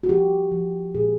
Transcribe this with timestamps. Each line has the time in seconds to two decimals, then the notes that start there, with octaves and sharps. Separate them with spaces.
0.03 F#4
0.09 F3 G4
0.52 F3
0.95 A#2 G#4